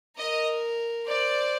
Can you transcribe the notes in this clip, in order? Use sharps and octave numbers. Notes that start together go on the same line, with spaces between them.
A#4 D#5
C5 D5